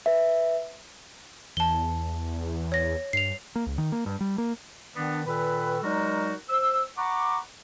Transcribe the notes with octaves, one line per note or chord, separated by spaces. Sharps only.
B4 E5
E2 A5 G7
C#5 A#6
G2 C7 F7
A#3
C#2
D#3
A#3
G2
G3
A#3
D#3 B3 D4
A#2 D#3 A4 B4
F#3 G#3 D#4 F#4 A#4 D5
C5 E6
F#5 A#5 B5 C#6 D6